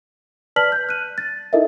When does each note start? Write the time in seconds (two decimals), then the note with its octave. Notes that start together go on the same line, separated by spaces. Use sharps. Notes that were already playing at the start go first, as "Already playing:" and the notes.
0.56 B4 D5 A5 F6 B6 F#7
0.72 G6
0.89 F#6 D#7
1.18 A6
1.53 D#4 E4 A4 A#4 D#5 E5